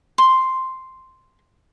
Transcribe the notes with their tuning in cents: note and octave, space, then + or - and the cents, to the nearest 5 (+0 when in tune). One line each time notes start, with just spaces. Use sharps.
C6 +0